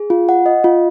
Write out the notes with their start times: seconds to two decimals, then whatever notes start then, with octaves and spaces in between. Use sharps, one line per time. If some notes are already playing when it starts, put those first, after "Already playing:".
Already playing: G#4
0.10 F4
0.29 F#5
0.46 D#5
0.64 F4